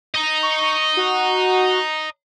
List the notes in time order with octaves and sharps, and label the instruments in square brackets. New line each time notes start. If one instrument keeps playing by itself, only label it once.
[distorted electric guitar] D#5 A#5
[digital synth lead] C#6
F#4